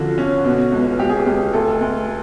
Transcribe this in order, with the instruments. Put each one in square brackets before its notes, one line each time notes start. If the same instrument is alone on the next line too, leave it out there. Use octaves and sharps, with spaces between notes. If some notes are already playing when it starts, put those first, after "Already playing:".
Already playing: [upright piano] D3 F3 C#4 [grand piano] F4 F#4
[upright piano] C#4
B2
C#2
[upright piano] C#2 [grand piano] G4
[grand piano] G#4
G4
[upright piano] C#2
[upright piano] D2 [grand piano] A4
[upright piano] D2